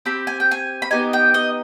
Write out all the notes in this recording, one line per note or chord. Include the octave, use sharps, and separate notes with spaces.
C4 G4 B5
G#5
G5
G#5
B5
B3 D#4 G4 G#5
G5
D#5